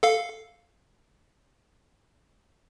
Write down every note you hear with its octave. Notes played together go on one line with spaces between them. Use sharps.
A4 F5